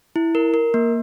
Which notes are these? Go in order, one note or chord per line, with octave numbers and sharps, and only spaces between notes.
E4
A#4
A#4
A#3